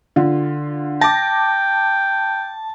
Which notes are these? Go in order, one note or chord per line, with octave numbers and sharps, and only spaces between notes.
D3 F4
G5 A5 D6 A#6